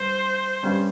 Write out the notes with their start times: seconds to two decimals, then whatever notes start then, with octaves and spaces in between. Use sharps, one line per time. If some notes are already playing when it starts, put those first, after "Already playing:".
Already playing: G2 C5
0.63 G2 G3 C#4